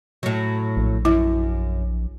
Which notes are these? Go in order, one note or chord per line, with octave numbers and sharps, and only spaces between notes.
A2 F#3
A#1
F#2 E4